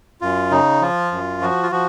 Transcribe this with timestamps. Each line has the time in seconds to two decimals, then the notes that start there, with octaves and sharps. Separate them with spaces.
0.21 F#2 F4
0.51 C#3 D#4
0.81 F3 F4
1.12 F#2
1.41 F3 F#4
1.63 F4
1.71 F3 F#4